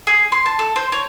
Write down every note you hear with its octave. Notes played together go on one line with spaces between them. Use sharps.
G#4
C6
A5
A4
C5
C#5